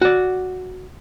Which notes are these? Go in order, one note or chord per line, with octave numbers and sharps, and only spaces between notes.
F#4 D5